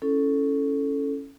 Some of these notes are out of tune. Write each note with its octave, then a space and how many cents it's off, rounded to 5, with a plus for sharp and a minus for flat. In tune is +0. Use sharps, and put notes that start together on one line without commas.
C#4 +0 E4 +0 A4 +0